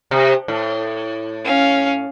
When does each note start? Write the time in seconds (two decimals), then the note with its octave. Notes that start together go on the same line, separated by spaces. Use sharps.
0.11 C3
0.48 A2
1.45 C#4 F5